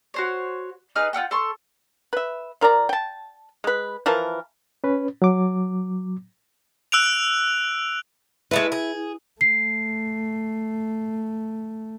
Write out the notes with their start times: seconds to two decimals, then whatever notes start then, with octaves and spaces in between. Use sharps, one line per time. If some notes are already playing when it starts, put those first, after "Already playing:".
0.14 F#4 C5 C#5
0.96 D#4 G#4 B4 F6
1.13 F4 A#4 F#5 G5
1.31 A4 C6 C#6
2.13 B4 E5
2.61 F3 A#4 D5 A#5
2.89 G5 A5
3.64 G#3 B4
4.06 E3 F3 A#4 A5
4.84 C#4 B4
5.22 F#3 D6
6.92 E6 F#6 D7 F7
8.51 G#3 A3 E4 B4
8.72 G#4
9.41 A3 C7